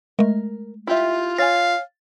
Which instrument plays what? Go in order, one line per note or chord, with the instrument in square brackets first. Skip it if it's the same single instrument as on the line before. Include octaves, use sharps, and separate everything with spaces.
[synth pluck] G#3 A3 [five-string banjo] A#4
[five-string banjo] E4 G4 E5 [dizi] F4
[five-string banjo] C#5 G#5 [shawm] F5 [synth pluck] A6